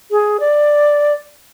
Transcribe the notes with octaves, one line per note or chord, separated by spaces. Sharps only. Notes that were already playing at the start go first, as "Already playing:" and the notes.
G#4
D5